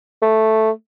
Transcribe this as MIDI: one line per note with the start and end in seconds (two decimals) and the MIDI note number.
0.22 0.70 57